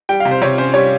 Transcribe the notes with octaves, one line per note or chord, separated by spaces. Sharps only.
G3 G5
F5
C3
C5
C3 C#5
C#4 C5
G3 C#5